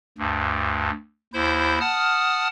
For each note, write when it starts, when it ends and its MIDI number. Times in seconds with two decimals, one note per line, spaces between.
0.18 0.90 38
0.18 0.90 43
1.34 1.79 39
1.34 1.79 64
1.34 1.79 72
1.34 1.79 91
1.80 2.48 78
1.80 2.48 81
1.80 2.48 87
1.80 2.48 89